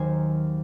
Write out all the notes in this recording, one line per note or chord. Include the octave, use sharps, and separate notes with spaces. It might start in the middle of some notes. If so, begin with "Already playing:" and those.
Already playing: D#2 D#3 F#3 A#3 A#4 C5 G#5